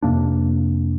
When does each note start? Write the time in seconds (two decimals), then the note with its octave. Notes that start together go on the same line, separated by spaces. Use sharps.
0.03 F2 C3 A#3 D4